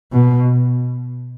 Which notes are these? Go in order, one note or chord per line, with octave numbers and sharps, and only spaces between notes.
B2